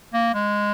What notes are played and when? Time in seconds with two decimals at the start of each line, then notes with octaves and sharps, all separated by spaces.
0.13 A#3
0.34 G#3